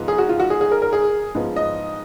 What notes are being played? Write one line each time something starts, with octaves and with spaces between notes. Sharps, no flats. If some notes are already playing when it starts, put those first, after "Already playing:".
Already playing: G#2 F3 G#3 B3
G#4
F#4
F4
F#4
G#4
G#4
A#4
A#4
G#4
G#2 F3 B3
D#5